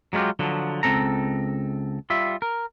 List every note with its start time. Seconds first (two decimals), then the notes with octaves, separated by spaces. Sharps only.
0.13 F#3 G#3 B3 F4 G4
0.39 D3 F3 F#3
0.83 C#2 C4 A4 A#5
2.10 G3 F4 E5
2.42 A#4